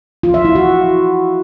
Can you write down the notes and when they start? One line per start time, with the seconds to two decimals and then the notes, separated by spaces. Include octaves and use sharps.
0.23 F4
0.34 E5
0.45 E4
0.55 F#4